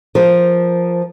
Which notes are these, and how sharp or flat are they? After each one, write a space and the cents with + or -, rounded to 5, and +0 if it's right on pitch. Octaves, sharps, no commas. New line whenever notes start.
F3 +0 A#4 +0